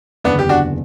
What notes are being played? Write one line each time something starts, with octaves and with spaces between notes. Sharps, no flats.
F#1 E2 D3 B3 D4
G4
D4 F#4